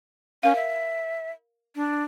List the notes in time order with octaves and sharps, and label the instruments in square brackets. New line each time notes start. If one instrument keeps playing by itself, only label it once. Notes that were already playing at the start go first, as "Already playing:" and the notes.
[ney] C#4 [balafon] A#4 F5
[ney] E5
D4